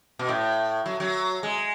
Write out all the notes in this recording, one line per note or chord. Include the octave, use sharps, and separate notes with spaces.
B2
A2
F#3
F#3
G#3